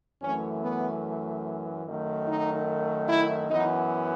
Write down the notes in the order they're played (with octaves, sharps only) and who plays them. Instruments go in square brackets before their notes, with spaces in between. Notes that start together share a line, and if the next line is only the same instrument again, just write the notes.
[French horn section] F#2 E3 A3 C#4
B3
F#2 D#3 A3
D#4
E4
F#2 E3 B3 D#4